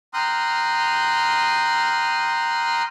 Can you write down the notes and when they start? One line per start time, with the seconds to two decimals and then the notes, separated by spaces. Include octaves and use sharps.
0.14 G5 A#5 C6 D#6 F6 F#6